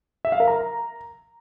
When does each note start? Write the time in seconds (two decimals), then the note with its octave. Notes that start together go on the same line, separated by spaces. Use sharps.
0.25 E5
0.32 F5
0.40 A#4
0.48 A#5